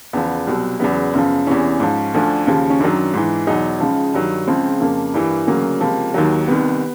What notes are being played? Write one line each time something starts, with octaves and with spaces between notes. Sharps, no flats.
E2 C#3 F3 B3
C2 B2 F#3
E2 C#3 F#3 B3
F#2 C#3 F3
E2 C3 E3 C#4
G#2 F3
D2 D3 F3
D#2 C#3 F3
C#4
F#2 D#3 F#3 D4
G#2 E3
E2 B2 F#3 D#4
C#2 C#3 F3
G2 D#3 F#3
C#2 C#3 F3 C4
F2 C#3 F3 A#3
G2 E3
D2 C#3 F#3 A#3
C#2 C3 F3
D#2 D#3 F#3
C2 C3 D#3 B3